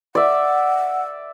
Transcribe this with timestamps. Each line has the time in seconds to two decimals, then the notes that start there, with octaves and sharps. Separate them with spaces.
0.15 D5 E5 F#5